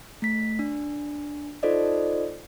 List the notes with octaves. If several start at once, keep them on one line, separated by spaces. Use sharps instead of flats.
A3 B6
D4
D#4 F4 A4 C5 D5 D#5